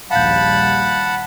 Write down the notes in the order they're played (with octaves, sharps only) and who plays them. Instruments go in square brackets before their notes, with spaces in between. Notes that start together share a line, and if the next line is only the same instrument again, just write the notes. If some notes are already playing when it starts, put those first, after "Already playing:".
[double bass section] A#1 D#2 G3 [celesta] F5 G6 [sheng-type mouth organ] F#5 A5 B5